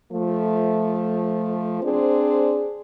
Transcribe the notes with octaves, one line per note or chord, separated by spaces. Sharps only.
F3 A3
C4 D4 G#4 C5